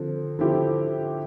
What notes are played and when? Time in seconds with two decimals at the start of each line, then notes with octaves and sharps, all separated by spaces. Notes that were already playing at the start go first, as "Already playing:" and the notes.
Already playing: D3 F3 C4
0.39 D3 F3 C4 E4 G4